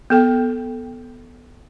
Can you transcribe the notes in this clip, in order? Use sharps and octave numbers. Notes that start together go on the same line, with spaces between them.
B3 A4 G5